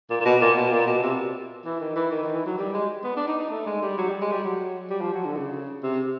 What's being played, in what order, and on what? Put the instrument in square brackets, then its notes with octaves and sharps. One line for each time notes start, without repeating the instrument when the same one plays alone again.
[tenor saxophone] A#2
A#2
B2
A#2
B2
A#2
B2
C3
E3
D#3
E3
D#3
D#3
E3
F#3
G3
G#3
B3
D4
D#4
D#4
A3
G#3
G3
F#3
G3
G#3
G3
F#3
G3
F3
F#3
D3
C#3
C3